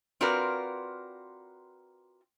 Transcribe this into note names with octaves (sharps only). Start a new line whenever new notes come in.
C4 F4 F#4 A#4 B4 D5